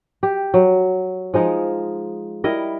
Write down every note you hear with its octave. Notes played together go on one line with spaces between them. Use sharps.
G4
F#3
F3 G#3 D#4
G3 E4 A#4 D#5